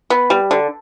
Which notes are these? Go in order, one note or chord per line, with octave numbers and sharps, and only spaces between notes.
B3
G3
D3